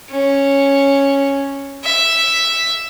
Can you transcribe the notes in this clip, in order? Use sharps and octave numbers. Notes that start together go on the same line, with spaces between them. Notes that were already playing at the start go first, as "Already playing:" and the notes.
C#4
E5